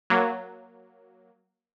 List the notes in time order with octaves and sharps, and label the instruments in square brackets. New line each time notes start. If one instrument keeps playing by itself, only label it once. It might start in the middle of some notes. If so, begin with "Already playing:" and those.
[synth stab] F#3 A#3